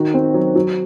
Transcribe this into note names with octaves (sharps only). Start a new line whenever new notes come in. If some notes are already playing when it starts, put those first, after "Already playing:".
Already playing: D#3 F#4
C4
F#3
F#3